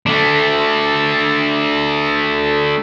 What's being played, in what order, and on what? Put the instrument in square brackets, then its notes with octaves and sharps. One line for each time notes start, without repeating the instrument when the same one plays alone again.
[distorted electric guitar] A3 D4